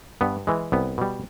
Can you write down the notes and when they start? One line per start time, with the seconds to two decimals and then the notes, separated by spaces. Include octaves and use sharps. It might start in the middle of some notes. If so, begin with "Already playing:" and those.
0.21 G2 B3
0.47 E3 G#3
0.72 C2 B3
0.98 B2 G3